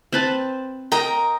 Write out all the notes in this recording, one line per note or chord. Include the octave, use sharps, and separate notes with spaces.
C4 B4 A5
A#4 D#5 G5 A#5